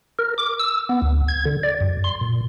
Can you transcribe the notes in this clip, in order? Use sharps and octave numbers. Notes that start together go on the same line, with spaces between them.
A#4
D6
E6
B3
D2
G#6
D3
D5
F#2
C6
A#2